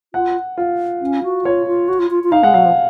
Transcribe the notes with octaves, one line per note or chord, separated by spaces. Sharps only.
F4 F#5
F4
C#4
F#4
F4 C#5
F4
F#4
F4
F4
F4
D#4 F5
G#3 F#5
F#3 F5
F3